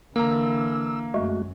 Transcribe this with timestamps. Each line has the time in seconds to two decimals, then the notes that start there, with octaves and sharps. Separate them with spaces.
0.16 D3 E3 A#3 A#5 E6
1.14 F#2 G#3 A3 F#4